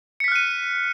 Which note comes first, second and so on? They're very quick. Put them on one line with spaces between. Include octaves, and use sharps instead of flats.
C#7 B6 F6 F#6 D#7